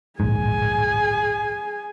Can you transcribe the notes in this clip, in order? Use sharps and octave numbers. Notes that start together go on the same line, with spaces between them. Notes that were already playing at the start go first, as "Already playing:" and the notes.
D1 A#1 G#2 G#4 G#5